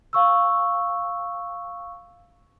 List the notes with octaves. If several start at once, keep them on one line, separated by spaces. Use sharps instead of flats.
F5 C#6 E6